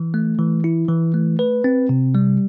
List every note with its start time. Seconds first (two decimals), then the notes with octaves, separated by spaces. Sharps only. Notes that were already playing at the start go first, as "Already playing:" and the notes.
Already playing: E3
0.14 A3
0.39 E3
0.64 E4
0.89 E3
1.14 A3
1.39 B4
1.64 C4
1.89 C3
2.15 G3